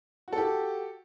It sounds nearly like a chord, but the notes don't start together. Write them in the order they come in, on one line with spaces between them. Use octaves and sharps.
F#4 A4 G4